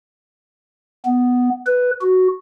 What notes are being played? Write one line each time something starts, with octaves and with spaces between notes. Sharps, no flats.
B3
B4
F#4